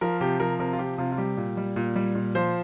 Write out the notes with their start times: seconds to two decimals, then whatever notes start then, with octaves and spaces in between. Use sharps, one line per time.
0.01 F3 A#4
0.21 C3 G4
0.40 F3 A#4
0.59 C3 A#4
0.73 F4
0.79 F3 G4
0.98 C3 F4
1.12 F4
1.18 G3 G4
1.37 A#2
1.57 G3
1.76 A#2
1.96 G3
2.15 A#2
2.35 F3 C5